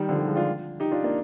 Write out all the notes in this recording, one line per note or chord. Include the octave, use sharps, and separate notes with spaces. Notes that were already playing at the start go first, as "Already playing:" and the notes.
Already playing: D#3 G3
D3 F3
D#3 G3
F3 G#3
D4 F4
D#4 G4
D4 F4
A#3 D4